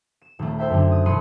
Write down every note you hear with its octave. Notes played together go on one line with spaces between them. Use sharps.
E7
D#1 A3
A4 C5 E5 G5
F#2 D3 A3 D4
D#6
E1 B5 C6 D#6 C#7 D#7